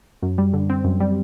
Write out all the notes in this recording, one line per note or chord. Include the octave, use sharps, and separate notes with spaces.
F#2
G3
D3
C4
F#2
G3